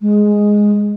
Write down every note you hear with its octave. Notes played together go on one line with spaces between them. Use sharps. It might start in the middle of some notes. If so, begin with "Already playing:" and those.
G#3